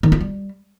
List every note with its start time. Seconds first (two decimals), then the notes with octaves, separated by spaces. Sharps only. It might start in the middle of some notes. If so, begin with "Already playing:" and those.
0.03 D#3
0.12 F4
0.21 G3